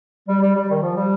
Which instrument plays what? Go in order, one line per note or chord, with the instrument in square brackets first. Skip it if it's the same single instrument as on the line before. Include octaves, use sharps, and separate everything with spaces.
[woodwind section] G3
G3
G3
D#3
F3
G3